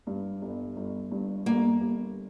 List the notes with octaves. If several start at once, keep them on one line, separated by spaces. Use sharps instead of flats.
G2
G1
G1
G2
G1 A#3
G1